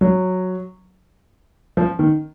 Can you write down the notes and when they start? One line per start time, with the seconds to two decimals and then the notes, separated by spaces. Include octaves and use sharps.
0.01 F#3
1.77 F3
1.99 D#3